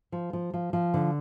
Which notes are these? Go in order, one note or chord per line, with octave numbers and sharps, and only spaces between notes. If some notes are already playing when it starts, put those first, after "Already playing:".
F3
F3
F3
F3
D3